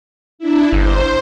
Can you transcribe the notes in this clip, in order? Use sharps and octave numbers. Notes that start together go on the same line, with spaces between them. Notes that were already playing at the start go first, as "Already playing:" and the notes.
D4 E4
G1 C5